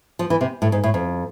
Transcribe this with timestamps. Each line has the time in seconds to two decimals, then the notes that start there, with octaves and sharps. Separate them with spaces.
0.19 F3
0.30 E3
0.41 C3
0.62 A2
0.72 G#2
0.84 A2
0.94 F2